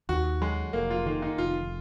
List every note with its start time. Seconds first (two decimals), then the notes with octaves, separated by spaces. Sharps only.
0.09 D#2 F#4
0.41 F#3 G#3
0.73 F1 A#3
0.90 F4
1.06 D#3 A#3
1.22 D#4
1.38 F1 F4